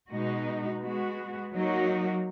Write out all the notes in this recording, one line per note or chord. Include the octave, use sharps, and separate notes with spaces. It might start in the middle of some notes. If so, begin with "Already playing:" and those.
B2 G#3 D#4 F#4
G#3 B3 F#4
F#3 A#3 D#4 F#4